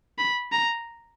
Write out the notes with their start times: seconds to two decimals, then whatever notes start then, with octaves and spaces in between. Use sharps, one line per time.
0.18 B5
0.52 A#5